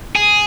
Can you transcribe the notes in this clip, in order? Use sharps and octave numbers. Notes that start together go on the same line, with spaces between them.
G#4